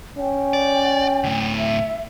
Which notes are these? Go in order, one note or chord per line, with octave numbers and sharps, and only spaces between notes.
C#4 G5
D5
D2 A2
E5